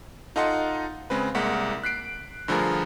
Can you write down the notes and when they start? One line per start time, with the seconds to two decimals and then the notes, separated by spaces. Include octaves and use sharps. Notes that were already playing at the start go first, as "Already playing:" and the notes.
0.36 D#4 F4 A4 D#5 F#5 C6
1.10 C#3 G#3 C4 B4
1.35 C2 G#3 A#3 F#5 B6
1.84 F#6 B6 C7 D7
2.48 G2 D3 F3 A3 G#4 A#4